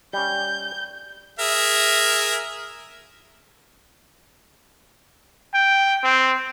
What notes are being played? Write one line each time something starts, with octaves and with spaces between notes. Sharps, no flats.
G3 C#4 G6
G#4 A#4 E5
G5
C4